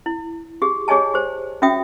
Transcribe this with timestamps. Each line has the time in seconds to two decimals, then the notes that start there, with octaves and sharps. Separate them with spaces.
0.06 E4
0.62 G4 G#4
0.88 G4 G#4 C#5 D#5 G#5 A5
1.14 G4 C5
1.62 C#4 F#4 E5 G5 D#6